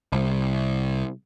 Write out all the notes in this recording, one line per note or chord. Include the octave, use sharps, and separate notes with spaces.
C2